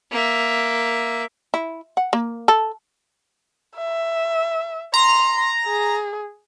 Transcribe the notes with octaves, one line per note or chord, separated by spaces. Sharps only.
A#3 E5
E4
F#5
A#3
A4
E5
A#5 C6
G#4